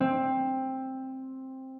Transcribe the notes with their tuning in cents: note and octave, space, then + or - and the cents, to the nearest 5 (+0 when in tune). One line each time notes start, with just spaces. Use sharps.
C4 +10